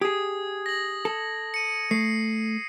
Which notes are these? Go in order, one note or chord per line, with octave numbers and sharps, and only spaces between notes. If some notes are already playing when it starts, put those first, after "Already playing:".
G4 G#4 D#6 G#6
A#6 F#7
A4
C#7 D#7
A3 C7